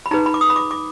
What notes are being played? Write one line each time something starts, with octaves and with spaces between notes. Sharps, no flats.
B5
D#4 G#4 B4 A#5
B5
D6
D#6
B5
D6
D6